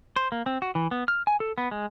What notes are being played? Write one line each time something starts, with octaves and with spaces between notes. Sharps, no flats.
C5
A#3
C4
F#4
E3
B3
F6
G#5
A4
B3
G#3